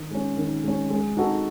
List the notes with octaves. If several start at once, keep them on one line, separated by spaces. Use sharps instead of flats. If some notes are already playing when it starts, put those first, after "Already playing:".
Already playing: D#3
G#3 C#4
D#3
G#3 C#4
G#3
D#4 F#4 A4